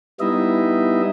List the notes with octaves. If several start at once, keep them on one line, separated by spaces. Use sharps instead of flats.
G3 B3 D#4 E4 D#5 E5